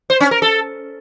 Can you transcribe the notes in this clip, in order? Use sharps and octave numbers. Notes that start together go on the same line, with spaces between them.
C5
C#4
A#4
A4